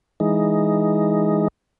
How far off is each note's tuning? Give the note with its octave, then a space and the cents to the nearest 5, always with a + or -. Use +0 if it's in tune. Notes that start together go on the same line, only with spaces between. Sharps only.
E3 +0 G#3 +0 D#4 +0